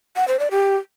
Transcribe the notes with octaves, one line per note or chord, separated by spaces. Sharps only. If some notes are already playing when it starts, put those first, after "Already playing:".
F#5
C5
D5
G4